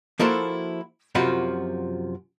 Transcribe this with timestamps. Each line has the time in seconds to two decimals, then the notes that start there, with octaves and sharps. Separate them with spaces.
0.19 F3 A#3 E4 F#4 A4 C5
1.15 F#2 C3 F3 F4 F#4 B5